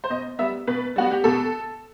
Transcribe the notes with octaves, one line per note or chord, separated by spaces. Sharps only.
C5
B2 D#5
G3 B3 E5
B2 B4
G3 B3 F#4
G4
B2 A4